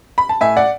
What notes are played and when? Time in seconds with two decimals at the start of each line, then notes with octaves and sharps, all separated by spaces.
0.18 B5
0.29 A5
0.41 A2 E5 G#5
0.57 D5 F#5